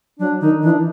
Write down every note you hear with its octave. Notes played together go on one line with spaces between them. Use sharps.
F#3 D4
D#3 D#4
E3 D4